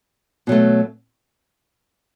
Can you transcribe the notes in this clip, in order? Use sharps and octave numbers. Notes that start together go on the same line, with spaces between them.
B2 F#3 A3